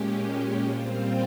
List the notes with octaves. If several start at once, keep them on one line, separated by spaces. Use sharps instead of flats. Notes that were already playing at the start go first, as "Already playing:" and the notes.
Already playing: A#2 G#3 C#4 G4
A#2 G3 C4 F4 C5